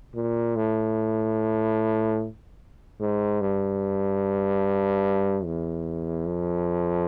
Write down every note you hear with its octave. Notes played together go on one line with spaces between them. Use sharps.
A#2
A2
G#2
G2
E2
F2